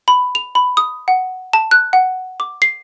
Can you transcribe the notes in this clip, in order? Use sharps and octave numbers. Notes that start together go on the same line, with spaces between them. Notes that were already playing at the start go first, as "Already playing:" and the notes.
B5
F7
B5
D#6
F#5
A5
F#6
F#5
D6
C7